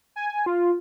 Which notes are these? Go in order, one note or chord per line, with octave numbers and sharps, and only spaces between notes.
G#5
F4